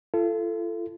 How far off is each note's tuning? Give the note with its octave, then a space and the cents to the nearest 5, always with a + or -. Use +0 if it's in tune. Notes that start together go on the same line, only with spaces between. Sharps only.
F4 -40 A4 +0